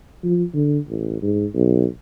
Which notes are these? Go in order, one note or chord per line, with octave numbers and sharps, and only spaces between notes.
F3
D3
A1
G#2
B1